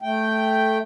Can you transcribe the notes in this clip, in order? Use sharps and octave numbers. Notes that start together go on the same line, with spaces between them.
A3 G5